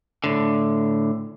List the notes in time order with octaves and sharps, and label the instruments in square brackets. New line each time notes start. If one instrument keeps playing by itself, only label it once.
[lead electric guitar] A2 D3